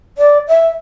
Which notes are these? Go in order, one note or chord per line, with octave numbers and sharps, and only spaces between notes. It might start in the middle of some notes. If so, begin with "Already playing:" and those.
D5
E5